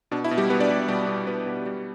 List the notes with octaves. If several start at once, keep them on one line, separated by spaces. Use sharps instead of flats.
B2 D4
E4
B2
G3 G4
B2 B3 B4
D4 D5
G3
B2 G3 G4
B2
B2 B3 B4
B2
G3